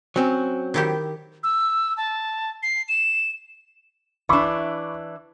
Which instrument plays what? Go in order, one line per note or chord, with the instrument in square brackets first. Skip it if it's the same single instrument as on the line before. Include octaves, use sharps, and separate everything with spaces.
[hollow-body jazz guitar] F#3 C4 C#4
[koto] D#3 E4 G4
[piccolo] E6
A5
C7
E7
[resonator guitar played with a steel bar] E3 D4 [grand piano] B5 C#6 D6